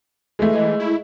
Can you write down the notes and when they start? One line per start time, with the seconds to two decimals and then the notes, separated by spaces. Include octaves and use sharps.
0.39 E3 G#3 A3
0.53 E3 G#4 D#5
0.79 E4